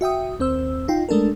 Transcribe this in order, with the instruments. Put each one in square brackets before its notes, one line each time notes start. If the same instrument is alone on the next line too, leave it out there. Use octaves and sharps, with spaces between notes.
[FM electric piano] F#4 E5 G5 D#6
D#2 C4 C5 E6
D#4 F4 G5
G#3 A3 D4 A4 A#4